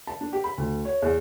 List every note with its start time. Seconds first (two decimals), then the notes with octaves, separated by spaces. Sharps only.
0.07 A5
0.21 D4
0.33 G4
0.44 B5
0.58 D2
0.85 C#5
1.02 E2